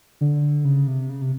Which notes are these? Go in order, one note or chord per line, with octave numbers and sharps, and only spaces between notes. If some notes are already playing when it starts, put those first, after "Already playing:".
D3
C#3
C3
C#3
C3